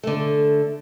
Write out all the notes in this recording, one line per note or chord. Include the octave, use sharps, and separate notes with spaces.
D3 A3